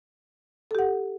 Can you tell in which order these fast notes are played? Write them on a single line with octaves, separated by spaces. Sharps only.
A4 G4 F#5